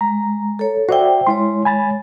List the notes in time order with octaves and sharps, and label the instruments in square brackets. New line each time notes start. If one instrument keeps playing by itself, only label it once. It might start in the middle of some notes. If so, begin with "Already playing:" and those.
[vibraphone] G#3 [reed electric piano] A#5
[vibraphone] A4 C#5
[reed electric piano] F#4 D5 E5 [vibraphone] C5 G5
[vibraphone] G#3 C#5 [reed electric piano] E4 C6
[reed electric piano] G#5 B5 A6